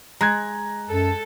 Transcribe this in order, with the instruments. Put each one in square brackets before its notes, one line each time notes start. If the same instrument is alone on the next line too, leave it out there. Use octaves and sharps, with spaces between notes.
[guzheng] G#3 [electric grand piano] A#5 F#6 G#6
[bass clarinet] F#2 [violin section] A4